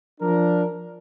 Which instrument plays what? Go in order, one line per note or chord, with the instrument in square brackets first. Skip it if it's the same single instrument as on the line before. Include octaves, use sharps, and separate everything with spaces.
[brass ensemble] F3 D4 A#4